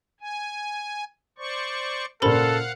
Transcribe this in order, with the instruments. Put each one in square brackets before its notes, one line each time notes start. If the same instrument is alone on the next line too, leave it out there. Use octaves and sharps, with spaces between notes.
[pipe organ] G#5
C5 D5 C#6
[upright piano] A#2 C#3 [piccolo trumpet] A4 [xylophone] A#4 C5 B5 [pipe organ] F5 F#5